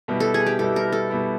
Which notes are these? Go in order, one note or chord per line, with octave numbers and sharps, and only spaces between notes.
B2 G3 B3 E4
A4
G#4
G4
B2 G3 B3 E4 A4
A#4
A4
B2 G3 B3 E4